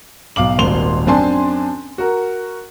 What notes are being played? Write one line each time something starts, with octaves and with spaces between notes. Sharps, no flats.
B1 F5 D6 F#7
D#1 G#1 C6 F7 G7
F#2 C4 D4 G#5 A5 C6
F#4 A#4